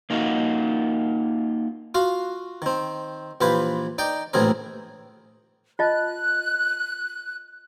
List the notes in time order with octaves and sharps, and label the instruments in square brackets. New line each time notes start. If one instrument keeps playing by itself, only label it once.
[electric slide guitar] A#3 D#4 F4 F#4
[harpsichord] F4 F#4 F5
D#3 C4
A#1 E3 F4 G4 B4 B5
D#4 D5 G5
A#1 A2 C3 E3 G#4 A#4
[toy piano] F4 D#5 A5 [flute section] F#6